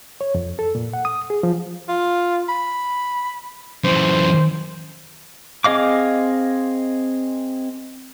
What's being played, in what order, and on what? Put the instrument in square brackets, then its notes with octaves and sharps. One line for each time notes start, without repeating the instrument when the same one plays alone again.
[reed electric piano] C#5
F2
A4
A#2
F#5
D#6
G#4
F3
[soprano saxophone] F4
B5
[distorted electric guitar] F#2 E3 [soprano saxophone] C5
[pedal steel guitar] C4 G#4 D#5 F5 D6